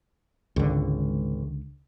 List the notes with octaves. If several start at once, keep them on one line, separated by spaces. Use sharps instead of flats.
G#1 C#2 D3